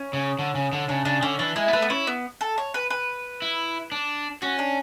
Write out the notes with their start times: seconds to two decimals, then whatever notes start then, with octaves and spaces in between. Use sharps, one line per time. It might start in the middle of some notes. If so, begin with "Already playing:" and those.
Already playing: C#4
0.13 C#3
0.39 D3
0.55 C#3
0.73 D3
0.89 C#3 D4
1.05 C#3 D4
1.23 D3 C#4
1.39 E3 D4
1.56 G#3 E4
1.68 B3
1.73 A3 B4
1.82 B3
1.90 C#4 E4
2.07 B3
2.41 A4
2.58 C#5
2.74 B4
2.90 B4
3.42 E4
3.92 D4
4.42 C#4 F#4
4.59 D4